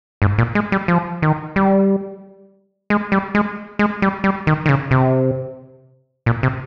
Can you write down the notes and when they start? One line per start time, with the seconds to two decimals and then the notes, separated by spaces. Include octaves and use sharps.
0.22 G#2
0.38 A#2
0.55 G#3
0.72 G3
0.88 F3
1.22 D#3
1.56 G3
2.90 G#3
3.12 G3
3.35 G#3
3.79 G#3
4.02 G3
4.24 G3
4.47 D#3
4.66 D#3
4.69 C#3
4.91 C3
6.26 A#2
6.43 C3